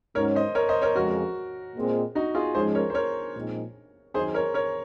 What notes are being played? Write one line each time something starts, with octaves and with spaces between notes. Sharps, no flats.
G#2 F#3 C#4 A#4 C#5
C5 D#5
A#4 C#5
C5 D#5
A#4 C#5
F2 C#3 G#3 F#4 A#4
A#2 G#3 C4
D#4 F#4
F4 G#4
G#2 F3 G#3 C#4 G#4 C5
A#4 C#5
C5
A#4 C#5
A#2 F3 G#3 C4 D#4
F#2 D#3 F#3 C4 D#4 G#4 C5
A#4 C#5
A#4 C#5